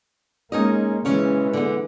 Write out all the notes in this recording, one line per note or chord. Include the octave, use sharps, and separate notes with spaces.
G#3 A#3 C#4 D#4 D#5
C#3 E3 G#3 C#4
D3 B3